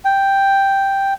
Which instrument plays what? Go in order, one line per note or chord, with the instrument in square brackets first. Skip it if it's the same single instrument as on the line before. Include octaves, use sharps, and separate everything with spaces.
[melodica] G5